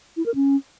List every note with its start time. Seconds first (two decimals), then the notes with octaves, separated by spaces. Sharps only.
0.17 E4
0.26 A#4
0.35 C#4